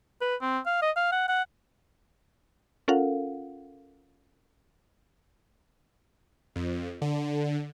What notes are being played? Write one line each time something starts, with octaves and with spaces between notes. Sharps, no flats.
B4
C4
F5
D#5
F5
F#5
F#5
C#4 F4 A4 A#4 F5 F#5
F2
D3